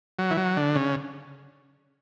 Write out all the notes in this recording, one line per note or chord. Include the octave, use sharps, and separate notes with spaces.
F#3
E3
F#3
D3
C#3